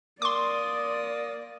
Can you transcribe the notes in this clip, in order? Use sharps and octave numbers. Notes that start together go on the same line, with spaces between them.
A#3 D5 C6 D6 D#6